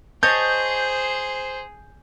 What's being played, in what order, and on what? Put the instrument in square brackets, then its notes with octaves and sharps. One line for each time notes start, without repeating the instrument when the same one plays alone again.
[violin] G#4 [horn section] C5 [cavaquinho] C#5 D#5 A5 [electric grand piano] G6